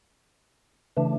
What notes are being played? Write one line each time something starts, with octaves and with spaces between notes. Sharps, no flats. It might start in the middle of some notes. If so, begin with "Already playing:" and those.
C#3 E3 A3 D4